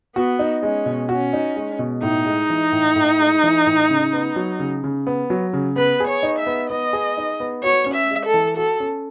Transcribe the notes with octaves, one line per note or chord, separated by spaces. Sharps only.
B3 F#4
D#4
G#3 C#4
B2
C#4 F#4
D#4
G#3
B2
A2 D#4
G#3
E3
A2
A2
G#3
E3
A2
C#3
B3
F#3
C#3
C#3
B3
F#3
C#3
B3 B4
G#4
C#5
D#4
E5
B3
B3 D#5
G#4
D#4
B3
F#4 C#5
C#4
E5
G#3
A4
E3
F#4 A4
C#4